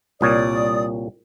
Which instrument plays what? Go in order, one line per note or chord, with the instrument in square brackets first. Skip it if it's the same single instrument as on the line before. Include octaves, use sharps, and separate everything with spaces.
[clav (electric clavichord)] C2 A#2 C#5 [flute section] D5 D#6